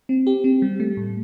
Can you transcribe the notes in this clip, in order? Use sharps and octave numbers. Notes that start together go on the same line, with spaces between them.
C4
G4
C4
G3
A3
A2